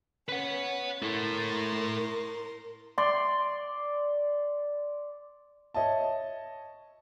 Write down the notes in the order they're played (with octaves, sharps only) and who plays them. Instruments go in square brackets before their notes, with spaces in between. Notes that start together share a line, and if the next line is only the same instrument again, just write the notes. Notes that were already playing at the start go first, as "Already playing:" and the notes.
[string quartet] C#4 [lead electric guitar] B4 F#5
[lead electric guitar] E4 A4 [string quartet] A#4 C6
[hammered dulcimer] D5 C6
[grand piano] C#5 D#5 E5 A5